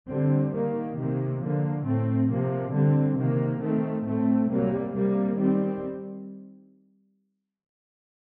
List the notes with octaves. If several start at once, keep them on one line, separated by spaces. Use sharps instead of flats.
D3 G3 C4
D#3 A#3
C3 D#3 A#3
D3 F3 A#3
A2 A3 C4
C3 F3 A#3
D3 G3 C4
C3 D#3 A#3
D#3 A3 C4
A2 A3 C4
C3 G3 A#3
C3 G3 A#3
D#3 G3 C4